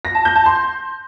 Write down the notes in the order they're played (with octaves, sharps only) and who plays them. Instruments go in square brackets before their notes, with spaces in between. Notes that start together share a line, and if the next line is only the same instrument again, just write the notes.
[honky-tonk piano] A#6
A5
G6
A5
C6